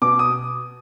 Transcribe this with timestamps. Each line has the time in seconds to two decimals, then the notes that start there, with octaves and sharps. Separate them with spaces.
0.02 B2 D6
0.19 D#6